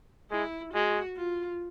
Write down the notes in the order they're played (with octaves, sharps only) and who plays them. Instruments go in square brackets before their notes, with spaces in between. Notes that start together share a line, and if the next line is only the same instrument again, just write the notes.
[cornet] G#3 [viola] E4
[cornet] G#3 [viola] F#4
[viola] F4